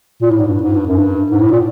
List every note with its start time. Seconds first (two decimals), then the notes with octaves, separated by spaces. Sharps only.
0.22 A#2
0.31 A2
0.39 G#2
0.48 G2
0.62 G#2
0.74 G2
0.87 F#2
0.98 G2
1.31 G#2
1.41 A2
1.51 A#2